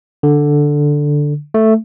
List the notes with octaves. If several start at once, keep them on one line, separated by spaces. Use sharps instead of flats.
D3
A3